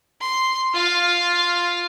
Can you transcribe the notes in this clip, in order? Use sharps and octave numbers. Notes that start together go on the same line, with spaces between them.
C6
F4 F5